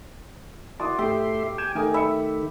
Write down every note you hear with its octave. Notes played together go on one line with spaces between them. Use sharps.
E4 F#4 D5 C6 D#6
A2 A3 G4 E5 C6
G5 G#5 E7
D#3 A3 A#4 G#5 D#6
E5 B5 C#7